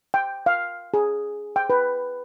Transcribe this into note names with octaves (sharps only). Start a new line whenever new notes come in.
G5
F5
G#4
G5
B4